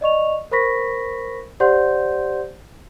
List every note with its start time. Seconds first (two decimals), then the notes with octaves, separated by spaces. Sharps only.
0.01 D5 D#5 C#6 F7
0.52 A#4 C5 B5 C#6 A#6 B6
1.60 G4 C5 D5 F#5 C6 G6